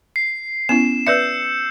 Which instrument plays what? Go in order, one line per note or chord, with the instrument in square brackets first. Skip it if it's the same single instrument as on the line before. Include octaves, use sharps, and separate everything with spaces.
[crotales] C7
[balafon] B3 C#4 E4 [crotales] E7
[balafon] B4 D5 E5 [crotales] E6 G6 C#7